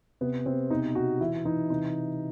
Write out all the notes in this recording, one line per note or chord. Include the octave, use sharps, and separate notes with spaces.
C3 B3
C3 C4
B2 D#4
B2 F#4
E3 E4
E3 D#4
C3 D#4